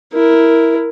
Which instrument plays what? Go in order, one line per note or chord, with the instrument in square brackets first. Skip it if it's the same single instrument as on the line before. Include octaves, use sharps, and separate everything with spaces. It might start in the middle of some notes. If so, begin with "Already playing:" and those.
[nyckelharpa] E4 A#4